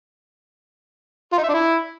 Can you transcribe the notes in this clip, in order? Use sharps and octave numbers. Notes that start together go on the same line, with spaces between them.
F4
D#4
E5
D4
E4